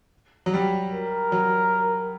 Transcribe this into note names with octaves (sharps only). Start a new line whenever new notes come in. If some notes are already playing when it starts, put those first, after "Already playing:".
F#3
G3
A#4
F#3